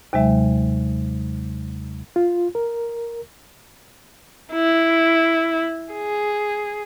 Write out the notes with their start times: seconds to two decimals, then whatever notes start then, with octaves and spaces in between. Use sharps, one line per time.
0.13 D#2 C3 F#3 G#3 E5
2.16 F4
2.55 A#4
4.53 E4
5.93 G#4